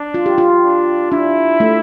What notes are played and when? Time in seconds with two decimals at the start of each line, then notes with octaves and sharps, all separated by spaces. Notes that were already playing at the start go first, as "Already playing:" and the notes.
Already playing: D4
0.14 F4
0.26 G4
0.38 F4
0.63 D4
1.12 D4 E4
1.60 A3